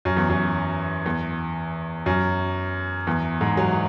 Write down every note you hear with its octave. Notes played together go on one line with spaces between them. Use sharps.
F#2
E2
F#2
E2
F#2
E2
G#2
F#3